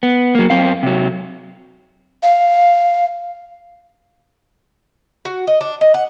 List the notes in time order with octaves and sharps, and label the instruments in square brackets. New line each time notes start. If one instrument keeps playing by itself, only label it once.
[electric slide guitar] B3
F#3 A#3
F#2 C4 F5
C3 F#3
[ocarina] F5
[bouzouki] F#4
D#5
D4
D#5
F#5